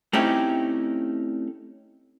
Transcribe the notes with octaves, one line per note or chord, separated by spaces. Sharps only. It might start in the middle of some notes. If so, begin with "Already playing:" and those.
A3 C4 C#4 D#4 E4 G4